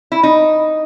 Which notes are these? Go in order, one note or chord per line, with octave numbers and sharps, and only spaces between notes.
E4
D#4